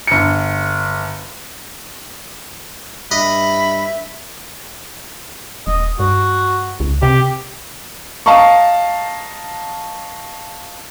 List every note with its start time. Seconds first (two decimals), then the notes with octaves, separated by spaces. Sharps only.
0.07 G1 C#7
3.11 G2 D#5 E5 B5
5.67 D#1 D#5
5.99 G2 F#4
6.80 C#2
7.02 C3 G4
8.26 D#5 F5 A5 A#5 C#6